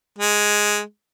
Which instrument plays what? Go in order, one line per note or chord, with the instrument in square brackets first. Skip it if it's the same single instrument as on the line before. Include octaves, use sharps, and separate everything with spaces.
[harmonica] G#3